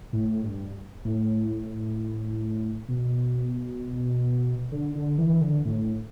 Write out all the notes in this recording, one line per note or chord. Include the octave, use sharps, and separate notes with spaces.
A2
G2
A2
B2
D3
D3
E3
D3
A2